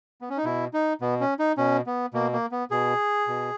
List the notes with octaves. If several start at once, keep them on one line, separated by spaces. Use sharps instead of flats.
B3
C#4
D#4
B2 E4
D#4
B2 B3
C#4
D#4
B2 C#4
B3
B2 A#3
A#3
B3
B2 G#4
B2